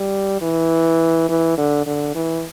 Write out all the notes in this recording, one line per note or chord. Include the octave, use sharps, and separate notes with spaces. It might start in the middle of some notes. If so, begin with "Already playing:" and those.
Already playing: G3
E3
E3
D3
D3
E3